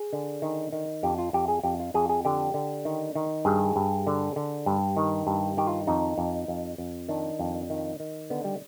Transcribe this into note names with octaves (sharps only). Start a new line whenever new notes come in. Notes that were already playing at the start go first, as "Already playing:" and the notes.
Already playing: G#4
D3
D#3
D#3
F2 G4
F4
F2 G4
G#4
F2 G4
F4
F2 G#4
G#4
D3 G4
D3
D#3
D#3
G2 G#4
G2
D3
D3
G2
D#3
G2
D#3 G4
F4
F2 D#4
F2
F2
F2
D#3 D4
F2
D#3
D#3
D3 B3
G3